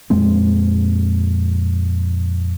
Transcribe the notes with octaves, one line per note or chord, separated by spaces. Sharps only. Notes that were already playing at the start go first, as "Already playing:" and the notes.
F2 A#2 G#3 C4